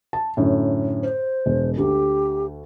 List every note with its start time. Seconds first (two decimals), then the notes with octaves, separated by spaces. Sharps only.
0.13 A5
0.37 F#2 A2 D3
1.02 C5
1.46 E1
1.78 D2 G4